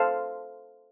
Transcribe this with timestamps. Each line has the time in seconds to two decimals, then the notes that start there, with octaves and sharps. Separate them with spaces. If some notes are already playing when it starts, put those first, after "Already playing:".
Already playing: A4 C5 F5 A5